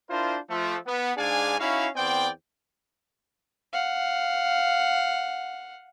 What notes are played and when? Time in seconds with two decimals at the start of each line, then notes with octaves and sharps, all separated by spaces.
0.10 D4 E4 F4 A#4 C5
0.50 F3 A3
0.87 B3
1.17 G#2 D4 G#4 D5 F5 G#5
1.59 C#4 D#4 E4 F#4 F5
1.96 E2 B3 C4 D5 G5
3.73 F5 F#5